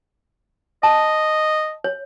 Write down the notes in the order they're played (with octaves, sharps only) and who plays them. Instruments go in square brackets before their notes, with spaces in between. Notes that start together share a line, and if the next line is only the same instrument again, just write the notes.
[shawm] D#5 [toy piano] A5
[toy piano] C#5